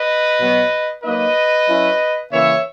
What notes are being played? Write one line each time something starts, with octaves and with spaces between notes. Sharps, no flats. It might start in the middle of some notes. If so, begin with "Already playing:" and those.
Already playing: B4 D#5
B2 F#3 B3
F#3 A#3 D#4 B4 D#5
F#3 C#4 E4
C#3 E3 A#3 C#5 E5